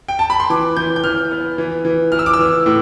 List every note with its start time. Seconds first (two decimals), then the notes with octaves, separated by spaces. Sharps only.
0.08 G5
0.19 A5
0.30 B5
0.40 C6
0.50 E3 D6
0.77 E3 G6
0.96 G6
1.04 E3 F6
1.31 B3
1.58 E3
1.85 E3
2.12 E3 F6
2.19 E6
2.26 D6
2.33 E6
2.39 E3
2.66 A2